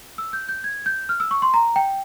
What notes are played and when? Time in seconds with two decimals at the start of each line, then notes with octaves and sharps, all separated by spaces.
0.18 E6
0.33 G6
0.49 G6
0.64 G#6
0.86 G6
1.09 F6
1.20 E6
1.31 C#6
1.42 C6
1.54 A#5
1.76 G5